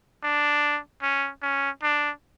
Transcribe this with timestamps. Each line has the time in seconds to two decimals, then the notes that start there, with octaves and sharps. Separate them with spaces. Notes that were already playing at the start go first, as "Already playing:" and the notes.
0.23 D4
1.02 C#4
1.42 C#4
1.83 D4